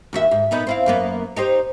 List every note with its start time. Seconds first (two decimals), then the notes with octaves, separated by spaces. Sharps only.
0.13 D#2 F#4 E5
0.31 G#2
0.51 A#2 B3 D#4
0.67 C4 E4 F5
0.86 F#2 A#3 B3
1.36 D#4 G4 C5